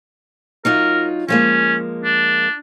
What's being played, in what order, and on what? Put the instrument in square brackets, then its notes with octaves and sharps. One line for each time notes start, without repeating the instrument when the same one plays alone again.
[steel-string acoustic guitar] F#3 D#4 F4 [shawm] A#4
[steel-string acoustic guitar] F3 G#3 A#3 [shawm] C#4
[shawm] D4